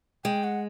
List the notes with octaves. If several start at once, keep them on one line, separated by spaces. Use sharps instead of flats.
G#3 G5
F#5